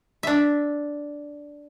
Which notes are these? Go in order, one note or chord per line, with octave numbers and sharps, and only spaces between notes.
D4 E5